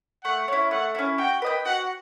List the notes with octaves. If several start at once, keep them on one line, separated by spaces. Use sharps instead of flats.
A3 F#5
C#4 E4
A3 F#5
C#4 E4
F#4 G5
B4 D#5 G5
F#4 F#5